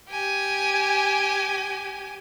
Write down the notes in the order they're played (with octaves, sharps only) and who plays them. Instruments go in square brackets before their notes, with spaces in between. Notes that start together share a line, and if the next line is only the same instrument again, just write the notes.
[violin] G4 G#5